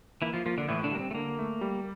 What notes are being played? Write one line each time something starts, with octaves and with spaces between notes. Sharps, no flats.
E3 A#3 E4
F3 F4
F3 A#3 F4
D3 D4
A2 E3 E4
D3 D4
G3 A#3
C4
A3
D3 A#3
A3
G3